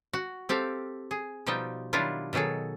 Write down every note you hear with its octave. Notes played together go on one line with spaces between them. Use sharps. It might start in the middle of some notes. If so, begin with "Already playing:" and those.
F#4
C4 G4 A4 F5
G#4
B2 F3 G3 D#4 G5
D#3 F#3 G3 D4 E4 F4
B2 D#3 F#3 G#4 A4